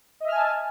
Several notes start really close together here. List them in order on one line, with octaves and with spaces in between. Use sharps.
D#5 E5 F6 G#5 A5